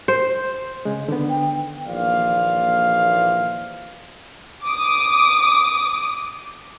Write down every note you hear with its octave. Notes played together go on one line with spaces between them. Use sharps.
C5
C#3 G#3
D3 D#3 B3
G5
A#1 D#2 E3 C5 D5 F5
D6 D#6